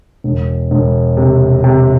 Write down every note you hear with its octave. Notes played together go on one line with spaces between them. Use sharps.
E1
E1
C3
C3